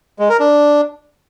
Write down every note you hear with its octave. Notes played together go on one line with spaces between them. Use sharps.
G#3
A#4
D4